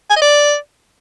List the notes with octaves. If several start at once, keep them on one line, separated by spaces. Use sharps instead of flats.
G#5
D#5
D5